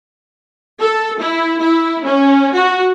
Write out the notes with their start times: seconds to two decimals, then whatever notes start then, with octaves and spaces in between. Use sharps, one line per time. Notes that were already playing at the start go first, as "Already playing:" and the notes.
0.80 A4
1.20 E4
1.61 E4
2.05 C#4
2.54 F#4